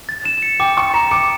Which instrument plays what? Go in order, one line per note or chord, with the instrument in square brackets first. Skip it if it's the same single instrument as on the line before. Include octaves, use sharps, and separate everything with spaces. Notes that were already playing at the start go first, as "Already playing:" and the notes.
[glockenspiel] A6
E7
C#7
[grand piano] G5 [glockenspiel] D6
[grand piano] C#6 [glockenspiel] A6
[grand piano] A#5 [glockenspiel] E7
[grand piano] D6 [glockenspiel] C#7